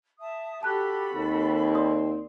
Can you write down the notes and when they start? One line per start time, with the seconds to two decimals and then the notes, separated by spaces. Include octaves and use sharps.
0.20 E5 A5 D#6
0.63 F#4 G4 A4 A5 B5 F#6
1.14 D#2 C4
1.75 D5 C6 D#6